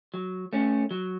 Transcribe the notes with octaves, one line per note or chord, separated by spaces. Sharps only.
F#3
A3 C#4
F#3